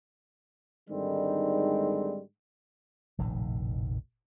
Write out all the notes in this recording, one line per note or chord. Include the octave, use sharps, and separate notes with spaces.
G#2 D3 D#3 G3 G#3 C4
F1 A#1 A2 D#3